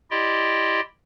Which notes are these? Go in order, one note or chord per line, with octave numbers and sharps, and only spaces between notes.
E4 G4 D5 D#5 G5 C6